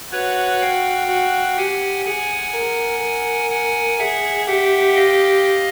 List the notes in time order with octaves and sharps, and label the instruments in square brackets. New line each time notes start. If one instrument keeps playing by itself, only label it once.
[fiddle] F#4 [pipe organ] B4 C#5
[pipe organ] F5 G5
[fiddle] F#4
[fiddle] G4 [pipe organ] F#5 G#5
[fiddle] G#4 [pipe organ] F#5 G#5
[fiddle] A#4
A#4
[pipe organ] F#5 G#5
[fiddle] G#4 [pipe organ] E5 F#5
[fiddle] G4 [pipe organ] E5 F#5
[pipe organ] D#5 F5